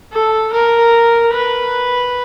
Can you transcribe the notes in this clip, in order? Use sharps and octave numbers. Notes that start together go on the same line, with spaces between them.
A4
A#4
B4